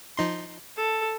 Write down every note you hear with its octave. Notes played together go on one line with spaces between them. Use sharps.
F3 D#4 C6
A4